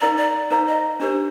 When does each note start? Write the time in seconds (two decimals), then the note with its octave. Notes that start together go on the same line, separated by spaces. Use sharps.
0.01 D#4 A#4 D5 F5 A#5
0.17 D5
0.51 D#4 A#4 C5 F5 A#5
0.67 D#5
1.00 D4 G4 A#4 C5